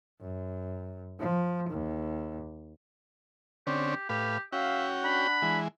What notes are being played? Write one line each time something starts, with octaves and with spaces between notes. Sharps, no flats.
F#2
F3
D#2
D3 C4 C#4 G4
A2 G4 B4 F5
C#4 F#4 E5 F5 G5
D4 F#5 B5
E3 G#3